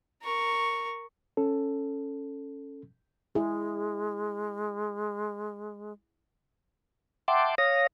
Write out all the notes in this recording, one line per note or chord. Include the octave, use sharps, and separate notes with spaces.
A#4 C#6
C#4 A4
G#3 E4 G#4
E5 F#5 G5 A5 C6 D6
C#5 F5 D#6 A#6